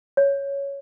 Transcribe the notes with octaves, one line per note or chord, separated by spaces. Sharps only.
C#5